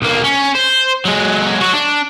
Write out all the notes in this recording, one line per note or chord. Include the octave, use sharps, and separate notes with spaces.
B1 A#3
C#4
C5
F#3 G#3
F#3 F#4
D4